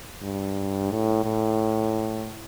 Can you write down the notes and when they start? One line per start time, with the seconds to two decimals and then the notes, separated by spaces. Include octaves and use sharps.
0.22 G2
0.91 A2
1.24 A2